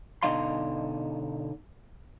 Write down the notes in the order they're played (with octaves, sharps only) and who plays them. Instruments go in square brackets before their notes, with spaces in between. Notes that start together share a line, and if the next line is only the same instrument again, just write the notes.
[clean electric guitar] B2 D3 D#4 D#5 F5 C6